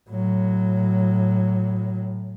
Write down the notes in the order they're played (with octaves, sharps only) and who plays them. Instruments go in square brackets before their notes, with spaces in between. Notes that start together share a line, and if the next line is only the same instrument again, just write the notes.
[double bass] A2 F#3